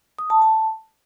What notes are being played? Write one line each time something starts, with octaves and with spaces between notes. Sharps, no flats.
D#6
A5
A5